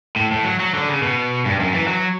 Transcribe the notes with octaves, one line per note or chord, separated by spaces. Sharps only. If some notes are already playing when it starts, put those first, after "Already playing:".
A2
A2
F#3
F#3
D3
C#3
B2
G2
F#2
E3
F#3